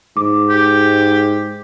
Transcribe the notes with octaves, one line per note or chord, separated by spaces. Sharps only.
G#2 D6
G4